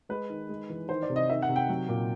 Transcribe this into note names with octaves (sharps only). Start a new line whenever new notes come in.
G#3 B4
D#3
G#3
E3
D#3 C5
D5
C3
D#5
D#3 E5
F#5
C3
G5
F#3
A#2